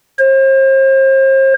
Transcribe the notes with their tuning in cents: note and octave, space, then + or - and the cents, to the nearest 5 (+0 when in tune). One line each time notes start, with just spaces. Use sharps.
C5 +40